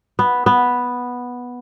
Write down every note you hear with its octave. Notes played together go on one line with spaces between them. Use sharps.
B3
B3